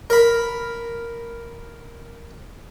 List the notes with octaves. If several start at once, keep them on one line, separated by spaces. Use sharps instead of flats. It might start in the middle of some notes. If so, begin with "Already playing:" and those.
A#4 B5